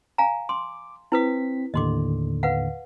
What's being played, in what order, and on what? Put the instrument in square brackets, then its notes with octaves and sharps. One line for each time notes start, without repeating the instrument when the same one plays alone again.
[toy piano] F5 G#5 A#5
[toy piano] C6 [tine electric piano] D6
[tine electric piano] C4 B6 [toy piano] E4 B4 D#6
[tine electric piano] D#2 A2 D3 [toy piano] D#5 C6 D6
[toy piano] B4 F5 F#5